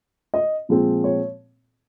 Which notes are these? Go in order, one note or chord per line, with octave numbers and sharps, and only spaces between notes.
D#5
A#2 F3 G#3 C4
C#5